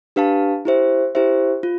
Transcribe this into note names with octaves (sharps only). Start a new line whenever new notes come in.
D4 G4 B4 F5 A5
E4 G4 C5 E5
E4 G4 C5 E5
F4